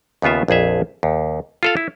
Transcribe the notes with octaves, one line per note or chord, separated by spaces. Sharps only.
D#2 C#3 B3 F4 E5
A#1 F2 G#4 E5
D#2
F4 A4 F5
E4